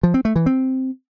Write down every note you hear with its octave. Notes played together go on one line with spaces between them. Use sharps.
F3
C4
A3
E3
C4